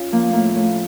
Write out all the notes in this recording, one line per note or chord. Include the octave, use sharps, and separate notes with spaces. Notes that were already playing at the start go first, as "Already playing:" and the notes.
Already playing: C#4 F4
F3 A#3
A2 A#3
A2